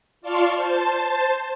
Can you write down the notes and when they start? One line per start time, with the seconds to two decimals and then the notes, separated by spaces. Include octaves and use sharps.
0.21 F4 D5 A5 C6 C#6 F6
0.56 C5 A5